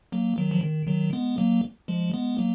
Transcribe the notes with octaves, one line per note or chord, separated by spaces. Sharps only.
F#3 A#3
D#3 F#3
F3
D#3
D#3 F#3
G#3 B3
F#3 A#3
F3 G#3
G#3 B3
F#3 A#3